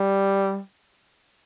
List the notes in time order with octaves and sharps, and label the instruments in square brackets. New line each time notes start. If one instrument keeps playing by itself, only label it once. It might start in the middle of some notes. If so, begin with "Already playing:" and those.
Already playing: [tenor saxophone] G3